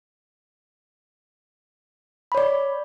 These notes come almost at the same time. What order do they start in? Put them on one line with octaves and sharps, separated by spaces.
B5 C#5 D5